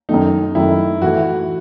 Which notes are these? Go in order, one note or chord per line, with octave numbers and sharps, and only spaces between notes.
F#2 D#3 A3 D#4
F#2 D#3 A3 E4
A2 E3 A3 E4 F#4